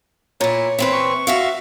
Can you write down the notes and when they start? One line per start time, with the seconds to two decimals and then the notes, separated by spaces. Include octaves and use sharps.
0.41 A#2 E4 C#5
0.79 E3 C4 B4
0.93 C#6
1.27 F#4 E5 F5